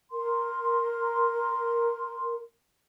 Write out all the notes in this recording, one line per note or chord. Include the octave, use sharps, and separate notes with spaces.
A#4 C6